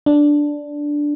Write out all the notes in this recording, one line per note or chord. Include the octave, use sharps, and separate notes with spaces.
D4